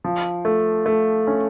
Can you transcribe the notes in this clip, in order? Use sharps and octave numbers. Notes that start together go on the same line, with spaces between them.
F3
A3
A3
C#4